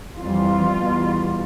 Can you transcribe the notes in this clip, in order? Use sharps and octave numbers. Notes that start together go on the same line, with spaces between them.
F2 E3 G3 F4
E2 B2 G3